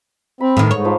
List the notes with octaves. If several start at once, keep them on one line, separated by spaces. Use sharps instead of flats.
C4 B5
A2 D#3 B4 D#6
G#2 C#5
F3 D#4 C5